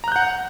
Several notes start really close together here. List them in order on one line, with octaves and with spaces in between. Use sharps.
A#5 F#6 G6 F#5